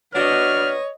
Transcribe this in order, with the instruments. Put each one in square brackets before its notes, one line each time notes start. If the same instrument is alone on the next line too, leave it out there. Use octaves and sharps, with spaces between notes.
[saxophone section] D4 F#4 [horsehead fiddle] B4 D#5 [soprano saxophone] C#5 [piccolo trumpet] F6